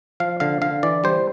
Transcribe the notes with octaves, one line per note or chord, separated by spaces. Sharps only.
F3 F5
D3 F5
D3 F5
E3 D5
G3 C5